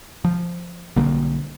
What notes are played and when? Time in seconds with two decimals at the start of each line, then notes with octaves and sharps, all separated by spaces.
0.24 F3
0.96 B1 D3 G3 A#3